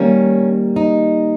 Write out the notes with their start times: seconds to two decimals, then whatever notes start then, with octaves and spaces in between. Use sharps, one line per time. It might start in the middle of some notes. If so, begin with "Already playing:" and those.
Already playing: D#3 G3 A#3 C#4
0.76 D#4